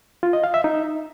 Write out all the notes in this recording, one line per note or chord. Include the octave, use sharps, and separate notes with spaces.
F4
D#5
F5
E5
D#4